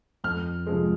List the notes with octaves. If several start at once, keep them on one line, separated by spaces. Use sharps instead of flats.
F2 F6
C3 F3 G#3